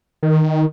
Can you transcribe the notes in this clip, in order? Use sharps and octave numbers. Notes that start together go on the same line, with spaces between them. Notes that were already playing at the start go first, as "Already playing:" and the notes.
D#3